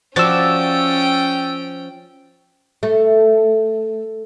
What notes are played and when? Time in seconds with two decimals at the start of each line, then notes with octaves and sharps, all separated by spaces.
0.16 F3 C#4 F#4 D5 G5 E6 A6
2.83 A3